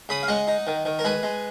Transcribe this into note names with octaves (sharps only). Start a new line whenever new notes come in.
C#3 B5 D#6
F5
G#3 D#5 F#5
D#4
D#3
D#3
A#4
G#3 G#4 B4
G#3